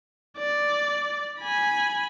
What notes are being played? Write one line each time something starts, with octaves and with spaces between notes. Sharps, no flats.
D5
G#5 B5